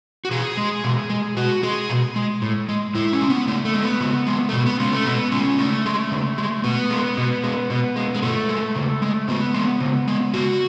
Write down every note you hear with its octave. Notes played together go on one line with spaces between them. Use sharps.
F#4
B2 G#4
G#3
B2
G#3
B2 F#4
G#3 G#4
B2
G#3
A2
G#3
A2 E4
C#4
G#3
B3
C#3 A3
A3
G#3
B3
C#3
G#3
A3
B2 B3
B3
G#3 C#4
A3
B2 B3
G#3 C#4
C#3 A3
G#3
C#3
G#3
B2 B3
G#3
B2
G#3
B2
G#3
G#3
B2 A3
G#3
C#3
G#3
C#3 B3
G#3
C#3
G#3
C#3 F#4